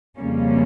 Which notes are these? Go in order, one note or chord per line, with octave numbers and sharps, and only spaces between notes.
F2 C#3 G3 A#3 C#4